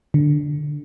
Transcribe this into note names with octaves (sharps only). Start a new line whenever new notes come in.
D3